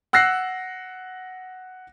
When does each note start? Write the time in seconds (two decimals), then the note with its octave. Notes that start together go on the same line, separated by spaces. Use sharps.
0.13 F#5 E6 F#6 A#6 C7